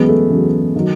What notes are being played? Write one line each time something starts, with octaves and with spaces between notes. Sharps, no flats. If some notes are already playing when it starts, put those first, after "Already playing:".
Already playing: E2 C#3 F#3 G#3 B3
A3
E2 C#3 F#3
D#3 F#3